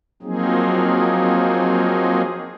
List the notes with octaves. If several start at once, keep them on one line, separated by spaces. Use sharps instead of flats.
F3 F#3 A#3 C4 D#4 G#4